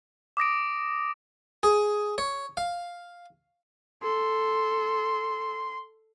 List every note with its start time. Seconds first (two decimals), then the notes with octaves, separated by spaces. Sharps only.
0.37 D6 D#6 A#6 D7
1.63 G#4
2.18 C#5
2.57 F5
4.03 A4 C6